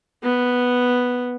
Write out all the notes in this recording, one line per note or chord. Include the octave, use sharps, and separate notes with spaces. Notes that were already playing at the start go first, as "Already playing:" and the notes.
B3